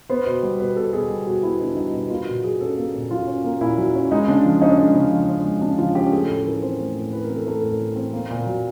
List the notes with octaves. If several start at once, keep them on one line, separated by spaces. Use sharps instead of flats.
B3 C5
B2
G3
B2 B4
B3 A4
B2 G#4
G3 G4
B2 F#4
B3 E4
B2 D4
G3 D#4
B2
A#3 F4
A#2 F#4
F#3 G#4
C#4 A4
A#3
A#2
F#3 F4
C#4
A#3
A#2 E4
F#3
C#4
G#3 D#4
C#3 D4
F3
C#4 D#4
D4
G#3 D#4
C#3
F3
C#4
G#3
C#3 D4
F3 F4
C#4 G4
A3 G#4
A2 A4
E3 A#4
C4 C5
A3
A2
E3 B4
C4 A#4
A4
A3 A#4
A2
E3
C4
A#3
A#2
F#3